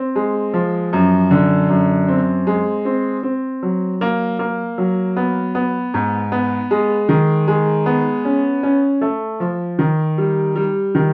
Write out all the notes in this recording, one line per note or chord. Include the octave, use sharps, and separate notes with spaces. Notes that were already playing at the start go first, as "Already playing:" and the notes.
Already playing: C4
G#3
F3
F#2
D3
F#2
C4
G#3
C4
C4
F#3
A#3
A#3
F#3
B3
B3
G#2
B3
G#3
D#3
G#3
B3
C#4
C#4
A3
F3
D#3
G3
G3
D#3